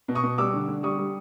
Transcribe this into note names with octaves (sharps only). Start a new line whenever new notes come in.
B2
C#6 D#6
B2
G3 D6 E6
D3
D3
G3 C#6 D#6
G3